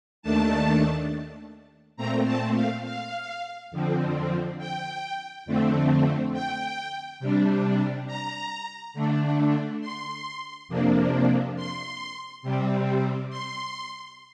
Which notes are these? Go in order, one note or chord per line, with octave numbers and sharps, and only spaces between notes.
D#2 D#3 A3 D4 A5
A#2 A3 C4 A#5
A5
F5
F5
F2 D3 F3 C4
G5
F2 D3 A3 C4
G5
C3 G3 D4
A#5
D3 A3 D4
C6
F2 C3 F3 A#3 D4
C6
C3 G3 C4
C6